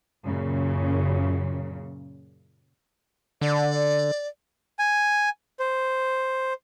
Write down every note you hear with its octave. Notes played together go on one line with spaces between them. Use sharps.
F#2 A#2 C#3
D3 D5
G#5
C5